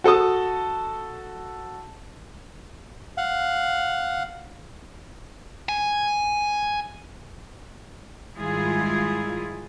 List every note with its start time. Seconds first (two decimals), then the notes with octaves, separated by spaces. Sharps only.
0.04 F#4 A4 A5 D#6
3.17 F5 F#5
5.69 G#5
8.36 G#2 D#3 G3 E4 F4 G#4